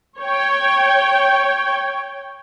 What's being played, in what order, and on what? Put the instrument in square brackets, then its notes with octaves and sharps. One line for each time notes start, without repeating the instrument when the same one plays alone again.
[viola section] C#5 G5